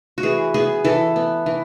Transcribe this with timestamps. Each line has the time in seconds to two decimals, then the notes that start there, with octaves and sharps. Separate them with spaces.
0.18 F#4
0.23 E3 G#4
0.54 B3 G#4
0.84 E3 A4
1.16 B3
1.46 E3